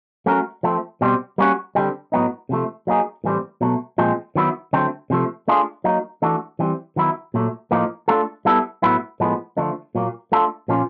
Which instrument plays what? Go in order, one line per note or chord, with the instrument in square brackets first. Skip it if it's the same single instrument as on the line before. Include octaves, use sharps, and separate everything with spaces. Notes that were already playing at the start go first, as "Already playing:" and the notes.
[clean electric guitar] F#3 A3 C#4 F#4 A#4
F3 A3 C4
B2 G3 C4
G3 A#3 C#4 F#4
D3 G3 C4
A2 F#3 B3 D#4
C3 F3 A3
F#3 A#3 D#4 G#4
A2 E3 G3 C4
B2 F#3 A3
A#2 F3 G#3 C4
D#3 F#3 B3 E4
D3 F#3 A3 C4
C3 F3 A3
A3 D4 F4 G#4
F#3 A#3 D#4
E3 A3 D4 F#4 A4
E3 G3 C4
D#3 F#3 B3 E4
A#2 F#3 A3
A2 F3 A#3 D#4
A3 D4 F4 A4
G3 B3 E4 A4
A2 F#3 B3 E4
A2 F3 G#3 B3
D3 F3 A3 D4
A#2 F#3 A#3
A3 D4 F4 A4
A#2 F3 A#3 C#4 F4